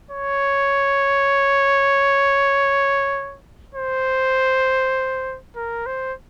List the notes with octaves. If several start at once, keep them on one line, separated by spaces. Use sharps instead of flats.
C#5
C5
A#4
C5